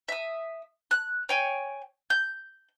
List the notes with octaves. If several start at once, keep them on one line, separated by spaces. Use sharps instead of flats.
E5 D#6
F#6
C#5 G5 G#5
G6